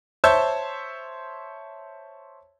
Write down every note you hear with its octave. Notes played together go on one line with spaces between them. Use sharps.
C5 C#5 E5 A5 E6 G6